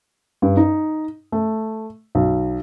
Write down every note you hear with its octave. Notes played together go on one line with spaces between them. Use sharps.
G2
D#4
A3
B1